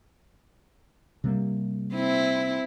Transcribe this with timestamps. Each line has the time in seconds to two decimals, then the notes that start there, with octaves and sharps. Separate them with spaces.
1.24 C3 G3 A#3
1.93 C4 E4